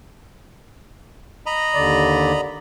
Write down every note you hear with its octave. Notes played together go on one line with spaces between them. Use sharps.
D#5 A#5 B5
D#2 D3 D5